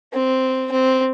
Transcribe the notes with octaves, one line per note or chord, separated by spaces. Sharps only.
C4
C4